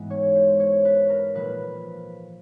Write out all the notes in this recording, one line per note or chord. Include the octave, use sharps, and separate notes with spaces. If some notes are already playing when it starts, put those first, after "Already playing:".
Already playing: G#2 E3 G#3 B3
C#5
C5
C#5
B4
A#4
A#2 F3 A#3 B4